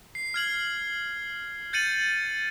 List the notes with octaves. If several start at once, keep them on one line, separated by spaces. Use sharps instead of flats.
C7
F6 G#6 F#7
G6 A6 C#7 D#7 F#7